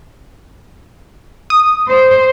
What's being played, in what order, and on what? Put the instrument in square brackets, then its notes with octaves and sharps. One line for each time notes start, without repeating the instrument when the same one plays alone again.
[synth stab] D#6
[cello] C5